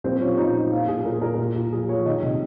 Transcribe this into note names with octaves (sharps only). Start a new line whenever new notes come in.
A#2 C4
F3 C#4
A#2 D#4
F3
A#2 F4
A#2 G#4
A#2 A#4
A#2 A#4
A#2
A#2
F3 G#4
F3 C#5
D#3 D#5
C3